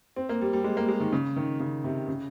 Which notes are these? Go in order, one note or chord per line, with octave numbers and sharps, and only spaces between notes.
C4
A#3
G3
G3
G#3
A#3
G#3
D#3
C#3
D#3
C#3
C3
C#3